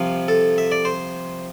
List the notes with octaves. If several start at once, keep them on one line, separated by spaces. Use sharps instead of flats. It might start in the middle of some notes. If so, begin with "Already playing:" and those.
Already playing: C2 C3 F3 F5
A4
E5
D5
C5